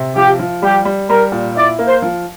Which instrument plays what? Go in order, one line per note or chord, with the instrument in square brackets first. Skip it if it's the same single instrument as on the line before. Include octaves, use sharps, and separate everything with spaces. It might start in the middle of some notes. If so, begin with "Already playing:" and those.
Already playing: [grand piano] C3
[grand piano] F3 [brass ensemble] G4
[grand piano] F3
[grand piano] G3 [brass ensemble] G4
[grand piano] G3
[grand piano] G3 [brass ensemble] A#4
[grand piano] A#2
[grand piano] E4 [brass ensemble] D5
[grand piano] A#3
[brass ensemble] C5
[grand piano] F3